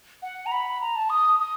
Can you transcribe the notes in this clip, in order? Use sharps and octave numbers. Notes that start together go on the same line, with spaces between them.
F#5
A#5
B5
A#5
A5
D#6
D#6